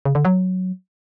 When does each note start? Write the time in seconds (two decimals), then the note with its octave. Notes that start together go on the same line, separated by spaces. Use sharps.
0.05 C#3
0.15 D3
0.25 F#3